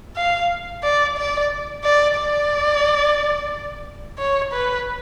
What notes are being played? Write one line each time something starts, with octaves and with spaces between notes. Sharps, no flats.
F5
D5
D5
D5
D5
C#5
B4